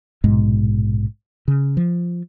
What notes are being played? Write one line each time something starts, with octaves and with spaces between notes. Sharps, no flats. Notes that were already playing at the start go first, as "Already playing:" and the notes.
A#1 G#2 B2 G#3
C#3
F3